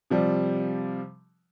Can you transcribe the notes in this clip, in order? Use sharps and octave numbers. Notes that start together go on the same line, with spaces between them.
C3 F3 G3